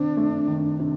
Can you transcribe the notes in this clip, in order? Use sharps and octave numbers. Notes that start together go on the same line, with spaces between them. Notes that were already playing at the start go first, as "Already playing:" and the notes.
Already playing: C3 D#3 C4 D4
A3
D#3
C3